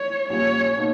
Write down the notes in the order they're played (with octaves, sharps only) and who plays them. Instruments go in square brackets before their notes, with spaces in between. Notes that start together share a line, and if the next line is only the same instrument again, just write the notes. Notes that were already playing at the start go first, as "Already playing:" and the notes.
Already playing: [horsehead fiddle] C#5
[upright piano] A#1 A#2 G3 C#4 [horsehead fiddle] C#5
[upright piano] B2 A#3 D#4